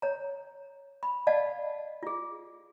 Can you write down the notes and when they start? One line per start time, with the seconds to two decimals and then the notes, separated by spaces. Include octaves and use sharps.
0.02 C#5 A#5
1.03 B5
1.27 D5 D#5 F5 F#5 A5
2.03 F4 G#4